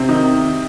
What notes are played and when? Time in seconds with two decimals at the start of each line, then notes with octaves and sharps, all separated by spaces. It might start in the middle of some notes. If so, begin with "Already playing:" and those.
Already playing: C3 C4
0.09 D#3 D#4